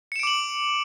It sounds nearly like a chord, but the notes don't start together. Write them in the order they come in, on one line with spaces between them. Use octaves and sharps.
C#7 E7 D7 D6 F#7